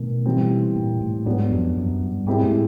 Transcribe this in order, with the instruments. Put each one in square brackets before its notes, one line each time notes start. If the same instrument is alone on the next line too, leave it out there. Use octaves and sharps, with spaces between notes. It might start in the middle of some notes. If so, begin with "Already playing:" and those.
Already playing: [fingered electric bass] B2 [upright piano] D#3 A3
[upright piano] E3 G3 C4
[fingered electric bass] A#2
A2
[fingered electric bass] G#2 [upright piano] F#3 B3 D4
[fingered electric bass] F2
F#2
G2
[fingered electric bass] G#2 [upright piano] G#3 C4 E4 G4
[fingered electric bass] A2